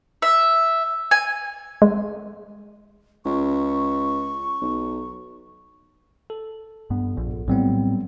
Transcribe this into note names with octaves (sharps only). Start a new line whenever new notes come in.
E5
G#5
G#3
C#2 C#6
B1
A4
G2 B3
A#1
A2 F#3 G3 B3 C4